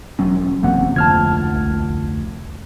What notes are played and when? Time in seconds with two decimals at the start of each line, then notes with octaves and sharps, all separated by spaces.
0.19 E1 F#3 C#4
0.63 F#1 E2 C3 A#3 F#5
0.96 F1 D2 F3 A5 F6 G#6
1.54 C2